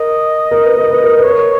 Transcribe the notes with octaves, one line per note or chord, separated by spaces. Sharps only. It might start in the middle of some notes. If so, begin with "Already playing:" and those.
Already playing: A#4 D#5
A#4
B4
A#4
B4
A#4
B4
C#5
A#4